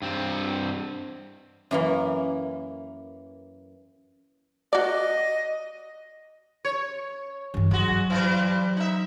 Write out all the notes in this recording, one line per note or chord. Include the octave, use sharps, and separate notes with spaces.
G2 C4
F#2 E3 A#3
F#4 D5 D#5
C#5
G2 E3
F#3 G#3 F#4
E3 G3 C5
D#4 E5